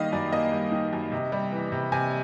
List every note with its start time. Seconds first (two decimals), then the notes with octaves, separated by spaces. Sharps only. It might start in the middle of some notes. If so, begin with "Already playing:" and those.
Already playing: D#3 G3 A#3 D#5 F5
0.12 F#2 D5
0.32 A#3 D#5
0.52 G3
0.72 D#3
0.93 F#2
1.12 C3
1.32 G3
1.52 E3
1.72 C3
1.92 C3 G#5